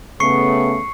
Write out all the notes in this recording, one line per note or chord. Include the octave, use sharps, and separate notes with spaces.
C#3 A3 B3 C#6 C7 C#7